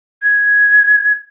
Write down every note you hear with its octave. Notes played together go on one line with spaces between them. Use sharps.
G#6